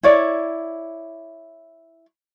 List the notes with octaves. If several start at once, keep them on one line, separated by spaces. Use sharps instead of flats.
E4 C#5 D5